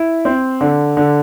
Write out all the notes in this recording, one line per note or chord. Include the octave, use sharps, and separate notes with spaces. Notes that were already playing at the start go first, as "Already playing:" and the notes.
Already playing: E4
C4
D3
D3